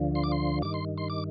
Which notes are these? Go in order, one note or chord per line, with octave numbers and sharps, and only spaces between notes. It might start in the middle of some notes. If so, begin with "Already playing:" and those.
Already playing: D2 D3 F3
C6
D6
C6
G2 D#3 D6
C6
C6
D6